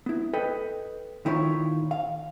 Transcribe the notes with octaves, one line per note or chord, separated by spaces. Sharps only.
B3 E4
A4 B4 D#5 G5
A#2 D#3 E4 F4 C#5
F5